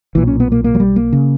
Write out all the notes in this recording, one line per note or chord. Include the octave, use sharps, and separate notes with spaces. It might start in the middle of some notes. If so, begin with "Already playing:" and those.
B1 A#2 E3
C#4
B3
A#3
A#3
F#3
G3
A#3
C#3